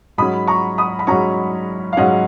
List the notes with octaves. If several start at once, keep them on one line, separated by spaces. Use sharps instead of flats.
G#2 F#3 C#4 B5 D#6
A#5 C#6
B5 D#6
B5
G#2 F#3 C#4 A#5 C#6
F5
G#2 F#3 C#4 D#5 F#5